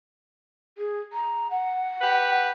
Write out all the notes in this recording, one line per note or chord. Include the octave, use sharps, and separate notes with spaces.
G#4
A#5
F#5
G4 B4